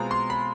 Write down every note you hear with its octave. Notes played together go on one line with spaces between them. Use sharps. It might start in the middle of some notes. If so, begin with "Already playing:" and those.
Already playing: B2 G#3 C4 F4 A#5
C6
B5